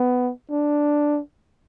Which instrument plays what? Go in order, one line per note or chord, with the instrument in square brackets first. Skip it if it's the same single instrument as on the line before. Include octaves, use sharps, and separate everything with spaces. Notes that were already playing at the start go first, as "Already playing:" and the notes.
Already playing: [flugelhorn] B3
D4